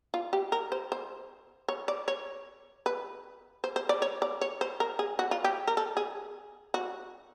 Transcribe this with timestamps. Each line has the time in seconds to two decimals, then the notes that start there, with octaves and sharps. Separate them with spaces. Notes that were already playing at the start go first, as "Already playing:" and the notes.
0.14 F4
0.33 G4
0.52 A#4
0.72 C5
0.92 C5
1.69 C#5
1.88 D5
2.08 C#5
2.86 B4
3.64 C5
3.76 C5
3.89 D5
4.02 C#5
4.22 D5
4.41 C#5
4.61 C5
4.80 A#4
4.99 G#4
5.19 F#4
5.31 F4
5.44 G4
5.67 A#4
5.77 A4
5.97 G#4
6.74 F#4